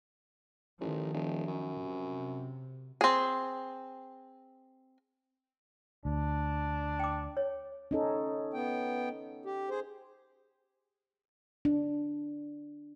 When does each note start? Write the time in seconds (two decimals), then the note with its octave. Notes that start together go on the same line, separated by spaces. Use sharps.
0.80 A1 D#3 F3
1.14 E1
1.47 F#2
1.81 C3
3.01 C4 G#4
6.05 D2 D4
7.00 G5 D6
7.37 C#5
7.91 C#4 D#4 A4
8.54 B3 G5
9.45 G4
9.70 G#4 C5
11.65 D4